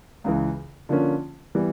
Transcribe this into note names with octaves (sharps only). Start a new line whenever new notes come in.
C#2 C#3 E3
D3 F3 A#3 C#4
E3 G3 B3